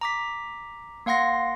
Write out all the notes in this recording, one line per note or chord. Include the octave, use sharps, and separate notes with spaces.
A#5 D6 B6
A#3 F5 F#5 C6 A#6